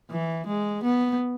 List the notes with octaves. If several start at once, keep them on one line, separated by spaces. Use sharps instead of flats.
E3
G#3
B3